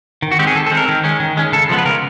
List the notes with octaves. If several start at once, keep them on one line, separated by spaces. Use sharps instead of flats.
D#3
F#4
G#3 C4 G4
G#4
D#3 A4
A4
G#3 C4
A#4
D#3
G#3 C#4
D#3
G#3 C#4
C#3 A4
F3 G#3 B3
B4
C#3 A#4